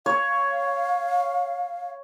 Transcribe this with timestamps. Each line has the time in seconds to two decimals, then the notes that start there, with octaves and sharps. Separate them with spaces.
0.06 C#5 F5